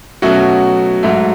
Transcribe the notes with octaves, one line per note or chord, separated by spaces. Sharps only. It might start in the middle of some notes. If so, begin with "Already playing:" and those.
B2 F#3 A3 C#4 F#4
G#2 F#3 A3